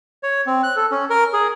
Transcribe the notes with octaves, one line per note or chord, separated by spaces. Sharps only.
C#5
C4
F#6
A4
C#4
A#4
G#4